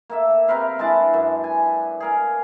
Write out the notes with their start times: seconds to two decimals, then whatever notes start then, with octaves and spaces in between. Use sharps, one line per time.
0.10 A#3 A4 E5
0.48 C3 A#4 B4 F5
0.79 G#3 D4 E4 A5
1.14 F#2
1.44 G#5
2.00 G#4 A#4 F5